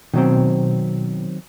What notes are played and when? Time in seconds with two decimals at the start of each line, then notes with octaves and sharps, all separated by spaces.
0.14 B2 D#3 F#3 C4